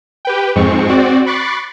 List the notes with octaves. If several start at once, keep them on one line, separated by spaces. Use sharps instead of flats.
G4 B4 G5
F2 G#2 G#3 C4 C#6
C4 F#4 D5
B5 C#6 D6 F#6 A6 C7